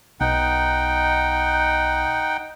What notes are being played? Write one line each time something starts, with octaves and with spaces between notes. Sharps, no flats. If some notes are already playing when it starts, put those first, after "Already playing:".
B1 D#4 F#5 G5